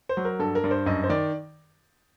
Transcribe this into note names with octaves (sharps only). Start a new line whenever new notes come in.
C5
F#3
A#4
G2 A4
A#4
G2 D5
C5
F#2 D#5
C5
D#3 D5